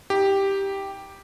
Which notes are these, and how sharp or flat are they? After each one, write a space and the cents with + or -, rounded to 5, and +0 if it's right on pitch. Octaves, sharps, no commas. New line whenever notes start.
D#4 +25 G4 +0